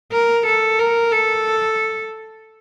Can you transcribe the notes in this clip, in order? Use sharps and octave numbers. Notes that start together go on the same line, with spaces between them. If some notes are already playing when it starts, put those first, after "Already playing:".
A#4
A4
A#4
A4